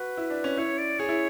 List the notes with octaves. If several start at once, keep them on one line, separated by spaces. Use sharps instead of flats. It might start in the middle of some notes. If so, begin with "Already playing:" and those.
Already playing: F#4 B4
E4
D4
C#4
E4 C#5
D5
G#4 C#5
E4